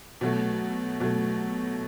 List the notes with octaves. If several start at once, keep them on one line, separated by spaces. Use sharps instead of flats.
B2 F#3 A3
B2 F#3 A3